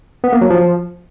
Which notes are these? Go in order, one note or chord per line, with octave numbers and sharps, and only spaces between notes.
B3
A#3
F#3
F3